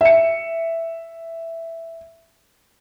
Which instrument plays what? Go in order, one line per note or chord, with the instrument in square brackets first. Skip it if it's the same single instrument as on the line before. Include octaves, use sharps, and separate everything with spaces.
[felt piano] E5 C#7